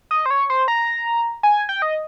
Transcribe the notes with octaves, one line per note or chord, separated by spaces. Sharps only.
D#5
C5
C#5
C5
A#5
G#5
G5
D#5